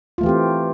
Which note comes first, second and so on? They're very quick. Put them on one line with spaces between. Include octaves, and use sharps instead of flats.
F4 A3 E3 G4 C4